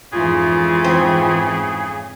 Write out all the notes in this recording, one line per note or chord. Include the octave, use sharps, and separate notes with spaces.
F2 G#2 C#3 E3 F4 G#4
C4